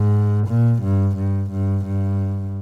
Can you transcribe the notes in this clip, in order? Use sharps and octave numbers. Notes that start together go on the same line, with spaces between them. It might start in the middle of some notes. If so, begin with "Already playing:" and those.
Already playing: G#2
A#2
G2
G2
G2
G2